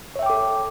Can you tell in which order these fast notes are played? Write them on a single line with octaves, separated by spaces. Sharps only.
C#5 E5 G5 D6 A4